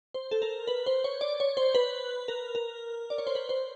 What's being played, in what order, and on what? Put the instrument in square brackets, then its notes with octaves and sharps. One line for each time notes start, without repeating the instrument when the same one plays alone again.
[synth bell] C5
A4
A#4
B4
C5
C#5
D5
C#5
C5
B4
A#4
A#4
D5
C#5
C5
B4
C5